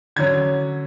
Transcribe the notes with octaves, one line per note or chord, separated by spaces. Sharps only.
D3 F#3 C#4 G#6